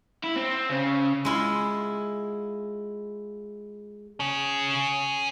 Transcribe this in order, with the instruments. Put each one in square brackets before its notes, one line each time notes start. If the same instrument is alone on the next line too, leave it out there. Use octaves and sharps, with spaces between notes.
[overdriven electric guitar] E4
C4
C#3
[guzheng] G#3 E4 F4
[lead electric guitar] C#4 G#4